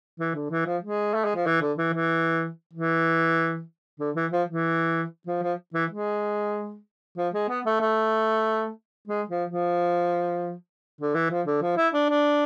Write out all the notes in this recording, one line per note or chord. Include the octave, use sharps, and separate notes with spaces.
E3
D3
E3
F3
G#3
A3
G#3
F3
E3
D3
E3
E3
E3
D3
E3
F3
E3
F3
F3
E3
G#3
F3
G#3
B3
A3
A3
G#3
F3
F3
D3
E3
F3
D3
F3
E4
D4
D4